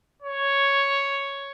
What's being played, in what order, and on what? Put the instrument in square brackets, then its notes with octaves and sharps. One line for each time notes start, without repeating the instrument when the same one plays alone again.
[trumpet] C#5